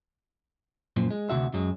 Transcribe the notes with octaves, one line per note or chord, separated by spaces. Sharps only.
F#2 A#2 F3
G#3
D2 G#2 C3 F#4 E5
F#2 F#3 G#3